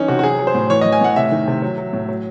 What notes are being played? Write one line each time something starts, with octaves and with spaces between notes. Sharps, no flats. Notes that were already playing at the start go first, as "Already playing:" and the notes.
Already playing: E3 C#4 D#4
C3 F#4
F#4
F#3 G#4
F#3
C5
A2
E3 C#5
D#5
E3
G#5
A2 F#5
C3 E5
D#3
C3
F#3
F#3
A2
F#3